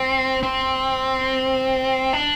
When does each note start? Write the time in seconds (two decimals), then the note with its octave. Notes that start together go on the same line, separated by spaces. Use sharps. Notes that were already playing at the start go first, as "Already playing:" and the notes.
Already playing: C4
0.43 C4
2.13 D4